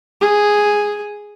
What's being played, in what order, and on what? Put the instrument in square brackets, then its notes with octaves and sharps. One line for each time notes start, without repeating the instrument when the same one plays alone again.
[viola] G#4